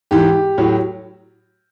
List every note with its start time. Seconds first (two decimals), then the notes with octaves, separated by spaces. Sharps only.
0.11 G#2 E3 G4
0.58 A2 F#3